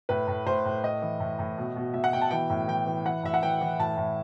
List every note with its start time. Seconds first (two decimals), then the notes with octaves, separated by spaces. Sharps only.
0.09 A2 B4
0.27 A2
0.46 A2 C5
0.65 A2
0.83 A2 D#5
1.02 E3
1.20 A2
1.39 A2
1.58 B2
1.76 B2
1.94 B2 E5
2.04 F#5
2.13 B2 G5
2.22 A5
2.31 E3 G5
2.50 A2
2.68 E3 G5
2.87 E3
3.05 E3 F#5
3.23 A2 E5
3.34 F#5
3.42 E3 G5
3.61 E3
3.79 A2 A5
3.97 A2